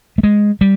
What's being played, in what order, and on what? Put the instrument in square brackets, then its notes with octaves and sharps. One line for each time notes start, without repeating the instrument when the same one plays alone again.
[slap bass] A3
G#3
G3